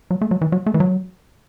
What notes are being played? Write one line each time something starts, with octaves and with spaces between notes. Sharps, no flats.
F#3
A3
F#3
E3
F#3
A3
E3
F#3